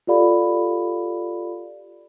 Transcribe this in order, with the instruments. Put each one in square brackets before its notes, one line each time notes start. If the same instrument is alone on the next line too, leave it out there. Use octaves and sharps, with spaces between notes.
[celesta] F4 G4 A4 D5 F5 B5